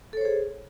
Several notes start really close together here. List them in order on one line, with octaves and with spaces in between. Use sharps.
A4 C#5 C5 G#4